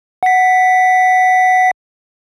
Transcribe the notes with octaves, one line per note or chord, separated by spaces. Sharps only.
F#5 B6